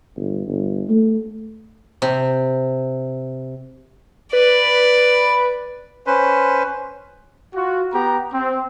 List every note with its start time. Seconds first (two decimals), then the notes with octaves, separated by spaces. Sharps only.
0.16 G1
0.47 G1
0.89 A3
2.02 C3
4.33 B4 D5
6.07 C#4 B4 C5
7.54 F4 F#4
7.92 B3 G4 A#5
8.32 C4